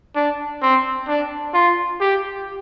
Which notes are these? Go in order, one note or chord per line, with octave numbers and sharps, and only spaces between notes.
D4
C4
D4
F4
G4